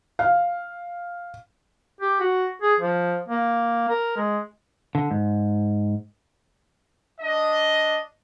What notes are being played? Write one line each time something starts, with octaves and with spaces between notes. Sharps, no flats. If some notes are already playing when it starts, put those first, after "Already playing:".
F5
G4
F#4
G#4
F3
A#3
A#4
G#3
D3
G#2
D4 D#5